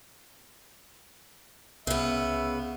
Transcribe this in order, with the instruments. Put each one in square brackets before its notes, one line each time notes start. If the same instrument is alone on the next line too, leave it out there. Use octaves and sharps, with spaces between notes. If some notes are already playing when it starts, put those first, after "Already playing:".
[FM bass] C2 [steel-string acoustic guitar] C#3 B3 [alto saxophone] E5